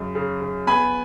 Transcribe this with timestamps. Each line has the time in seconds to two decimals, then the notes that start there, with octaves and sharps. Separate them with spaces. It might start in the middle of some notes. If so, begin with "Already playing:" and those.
Already playing: F#2 C#3
0.15 C#3
0.41 C#3
0.67 B3 G#5 B5